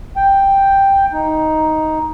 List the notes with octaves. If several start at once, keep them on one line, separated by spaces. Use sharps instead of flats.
G5
D#4